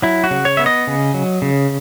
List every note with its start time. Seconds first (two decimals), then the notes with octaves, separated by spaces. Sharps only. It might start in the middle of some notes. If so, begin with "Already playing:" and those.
0.02 F#3 E4
0.24 F#4
0.31 C#3
0.45 C#5
0.57 B3 E5
0.66 D#5
0.87 C#3
1.14 F#3
1.42 C#3